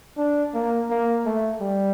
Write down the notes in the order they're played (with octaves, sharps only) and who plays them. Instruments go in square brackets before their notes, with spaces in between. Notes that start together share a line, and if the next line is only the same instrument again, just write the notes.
[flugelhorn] D4
A#3
A#3
A3
G3